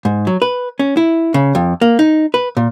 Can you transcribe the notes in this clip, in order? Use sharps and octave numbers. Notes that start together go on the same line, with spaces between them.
G#2
F#3
B4
C#4
E4
C#3
F2
A#3
D#4
B4
A#2